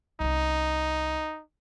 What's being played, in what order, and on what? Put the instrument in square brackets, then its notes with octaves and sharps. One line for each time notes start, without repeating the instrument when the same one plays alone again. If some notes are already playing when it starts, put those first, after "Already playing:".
[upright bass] C2 C#4 [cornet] D#4